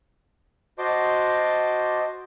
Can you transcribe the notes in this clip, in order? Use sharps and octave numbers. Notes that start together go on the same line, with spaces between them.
F#4 C5 D#5 A5 C6 D6